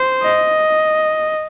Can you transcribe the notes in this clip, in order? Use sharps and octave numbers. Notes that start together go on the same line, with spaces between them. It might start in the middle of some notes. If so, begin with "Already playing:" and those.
Already playing: C5
D#5